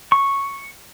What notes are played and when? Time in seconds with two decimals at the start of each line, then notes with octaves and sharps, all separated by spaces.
0.12 C#6